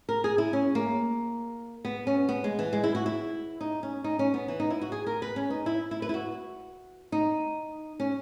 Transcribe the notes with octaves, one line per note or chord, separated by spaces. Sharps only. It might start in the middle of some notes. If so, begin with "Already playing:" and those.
A#4
G#4
E4
C#4
A#3
B3
C#4
B3
G#3
E3
G#3
E4
F#4
E4
D#4
C#4
D#4
C#4
B3
E3
D#4
E4
F#4
G#4
A#4
B4
C#4
D#4
E4
E4
B4
E4
F#4
D#4
C#4